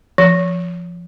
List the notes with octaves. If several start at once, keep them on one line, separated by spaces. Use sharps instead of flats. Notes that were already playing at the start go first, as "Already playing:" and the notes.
F3